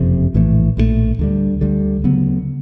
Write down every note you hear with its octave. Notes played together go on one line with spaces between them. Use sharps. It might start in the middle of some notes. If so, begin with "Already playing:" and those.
Already playing: F#1 F2 C3
A#1 A2 E3 A3
A#1 A2 E3 A3
D2 D3 G3
D2 D3 G3
D2 C#3 F#3 B3